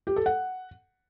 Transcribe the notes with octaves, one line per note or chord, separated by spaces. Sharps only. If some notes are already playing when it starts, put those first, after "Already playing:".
G4
A4
F#5